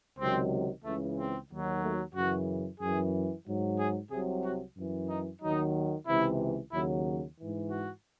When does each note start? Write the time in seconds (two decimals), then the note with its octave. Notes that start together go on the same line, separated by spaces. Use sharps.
0.19 C#2 C3 D#3 F#3 C4
0.85 C#2 C#3 E3 A3
1.18 C4
1.50 D#2 D#3 F#3
1.83 A3
2.15 F#2 C#3 E3 F#4
2.80 F#2 E3 G#4
3.47 G#2 F#3
3.78 G#4
4.11 C2 C3 F#3 G#4
4.44 F#4
4.77 F#2 E3
5.09 D#4
5.42 D#2 D#3 F#3 D#4
6.08 C#2 C3 E3 E4
6.73 D#2 C#3 F#3 E4
7.38 G#2 E3
7.71 F#4